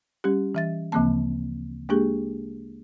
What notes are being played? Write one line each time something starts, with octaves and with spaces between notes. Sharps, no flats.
G3 C#4 G4
E3 E5 A6
D2 C#3 F3 A#3 C4 A5
G#3 A#3 D4 G4 G#4